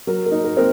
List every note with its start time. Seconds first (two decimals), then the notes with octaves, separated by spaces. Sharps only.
0.07 F#3 A#4
0.26 A#4
0.31 D#4
0.44 A#4
0.57 C4 A#4